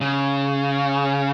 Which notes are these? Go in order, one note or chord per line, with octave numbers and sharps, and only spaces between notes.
C#3